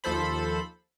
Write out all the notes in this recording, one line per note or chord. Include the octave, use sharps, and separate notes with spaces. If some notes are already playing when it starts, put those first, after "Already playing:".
D#2 F3 A4 C5 B5